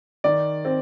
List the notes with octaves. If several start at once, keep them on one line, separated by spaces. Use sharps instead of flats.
D#3 D5
C4